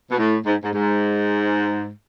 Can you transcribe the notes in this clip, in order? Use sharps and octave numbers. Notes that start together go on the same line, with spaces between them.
B2
A2
G#2
G#2
G#2